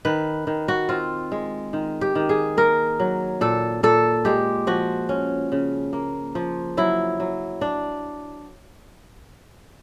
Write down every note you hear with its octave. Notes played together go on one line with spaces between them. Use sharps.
D#3 B4
D#3
F#4
C4 F4
G#3
D#3
G4
D#3
G#4
A#3 A#4
F#3
A#2 A4
A#2 A4
G#3 G4
F3 F#4
C#4
C#3
A#3
F3
F#3 E4
F#3
D4